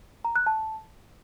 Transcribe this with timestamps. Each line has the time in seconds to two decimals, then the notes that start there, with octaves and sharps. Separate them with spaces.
0.25 A#5
0.36 F#6
0.46 A5